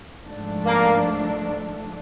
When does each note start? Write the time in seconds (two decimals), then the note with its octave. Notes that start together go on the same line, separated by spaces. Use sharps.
0.24 G#2 F3 A3 D4
0.66 A#3